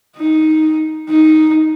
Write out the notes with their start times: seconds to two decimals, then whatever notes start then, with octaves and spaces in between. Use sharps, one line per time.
0.17 D#4
1.09 D#4